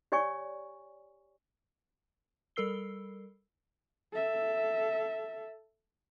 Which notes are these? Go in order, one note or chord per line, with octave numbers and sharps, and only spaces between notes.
G4 C#5 D5 G#5 C#6
G3 A4 A#4 E6 C7 G7
A4 E5